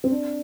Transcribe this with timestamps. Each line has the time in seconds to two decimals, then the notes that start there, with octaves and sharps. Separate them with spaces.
0.04 C4
0.11 D4